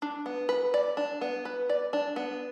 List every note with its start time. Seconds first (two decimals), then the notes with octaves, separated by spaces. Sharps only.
0.02 D4
0.26 B3
0.49 B4
0.74 D5
0.97 D4
1.21 B3
1.45 B4
1.69 D5
1.93 D4
2.16 B3